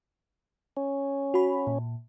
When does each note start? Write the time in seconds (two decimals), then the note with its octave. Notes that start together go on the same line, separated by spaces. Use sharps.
0.77 C#4
1.34 F#4 B5
1.67 A#2